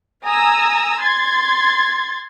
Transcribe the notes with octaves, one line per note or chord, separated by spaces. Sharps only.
G#5 A#5 D#6 E6
C6 G#6 A6